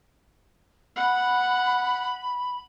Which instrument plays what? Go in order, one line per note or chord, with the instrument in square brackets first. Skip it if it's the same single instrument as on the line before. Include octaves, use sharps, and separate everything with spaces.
[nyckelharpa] F#5 [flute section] B5